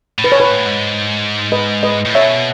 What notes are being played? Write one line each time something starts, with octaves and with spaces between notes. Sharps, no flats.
A2
B2 B4
C#5
A2 B4
G#2
B4 D#5
B4 D#5
A2
B2 C#5 E5